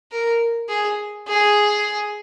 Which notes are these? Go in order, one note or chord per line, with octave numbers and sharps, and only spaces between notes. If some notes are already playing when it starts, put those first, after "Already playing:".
A#4
G#4
G#4